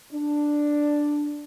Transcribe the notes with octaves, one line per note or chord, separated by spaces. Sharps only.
D4